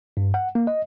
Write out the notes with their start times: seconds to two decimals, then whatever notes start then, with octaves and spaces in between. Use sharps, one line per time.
0.17 G2
0.34 F#5
0.55 A#3
0.67 D#5